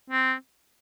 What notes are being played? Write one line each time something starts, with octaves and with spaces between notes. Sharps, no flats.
C4